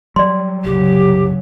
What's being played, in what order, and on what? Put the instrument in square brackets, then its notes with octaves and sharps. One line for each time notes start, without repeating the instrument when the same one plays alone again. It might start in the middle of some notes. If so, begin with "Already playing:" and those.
[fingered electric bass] F#3 G3 [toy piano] D5 C6
[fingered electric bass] F#1 C2 [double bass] C#3 F#3 [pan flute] G4